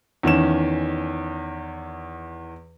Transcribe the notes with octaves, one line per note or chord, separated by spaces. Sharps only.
E2 D#3 C#4 E7